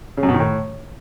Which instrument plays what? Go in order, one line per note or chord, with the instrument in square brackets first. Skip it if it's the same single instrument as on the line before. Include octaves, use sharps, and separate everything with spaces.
[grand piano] C#3
F#2
B2
D#3
A2